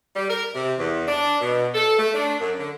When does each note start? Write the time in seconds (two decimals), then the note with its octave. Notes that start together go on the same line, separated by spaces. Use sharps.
0.16 G3
0.29 A#4
0.55 C3
0.79 E2
1.07 D4
1.41 B2
1.74 A4
1.98 A3
2.15 D4
2.39 F#2
2.59 D3